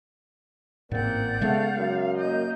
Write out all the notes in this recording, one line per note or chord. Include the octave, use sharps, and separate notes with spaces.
A1 G#2 A#3 C4 D5 F#5 G6
C#3 G#3 A3 B3 F5
F#2
A#3 D#5 G6